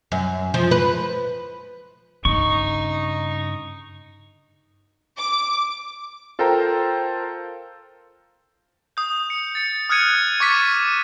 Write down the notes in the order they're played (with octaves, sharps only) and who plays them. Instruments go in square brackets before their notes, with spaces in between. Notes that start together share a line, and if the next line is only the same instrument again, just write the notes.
[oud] F#2
F3
B4
[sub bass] G2 [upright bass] C#3 [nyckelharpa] D#4 [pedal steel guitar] C#6
[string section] D6
[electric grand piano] F4 A4 A#4 C5 G5 A#5
[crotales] D#6 G6
C#7
A6 C#7
D#6 F6 F#6 G#6 C#7 D#7
C#6 D6 A6 B6 C#7 D#7